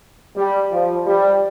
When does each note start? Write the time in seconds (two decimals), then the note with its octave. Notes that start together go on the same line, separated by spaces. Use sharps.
0.36 G3
0.72 F3
1.07 G3